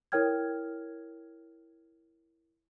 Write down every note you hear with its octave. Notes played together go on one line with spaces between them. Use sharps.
E4 A#4 C#5 G5 F6 G#6